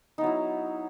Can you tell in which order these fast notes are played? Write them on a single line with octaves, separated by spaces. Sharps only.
D#4 B3 F#3 E4